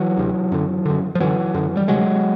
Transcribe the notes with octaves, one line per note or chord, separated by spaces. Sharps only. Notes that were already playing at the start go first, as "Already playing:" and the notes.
Already playing: E3 F#3
D2 C3
F#2 D3
F#2 D3
F3
F#2 D3 E3 F#3
F#2 D3
G3
D2 C3 F#3 G#3